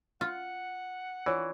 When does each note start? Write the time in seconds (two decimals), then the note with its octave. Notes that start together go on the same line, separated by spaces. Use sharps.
0.21 F4 F#5
1.26 E3 F4 C#5 D5